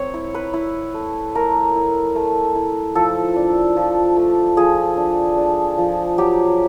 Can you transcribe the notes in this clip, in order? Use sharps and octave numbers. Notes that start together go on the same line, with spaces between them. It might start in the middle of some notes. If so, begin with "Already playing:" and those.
Already playing: C4 C#5
E4
B4
E4
A3
A3 A#4
E4
A3
E4
F3 A4
D4
F3
A3
F3 G#4
D4
D4
F3
F#3 G4